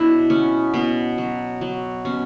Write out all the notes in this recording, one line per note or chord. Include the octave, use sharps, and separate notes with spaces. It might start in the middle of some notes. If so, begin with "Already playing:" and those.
Already playing: B2 F#3 D4 E4
B3 C#4
B2 B3
F#3
F#3
B2 C#4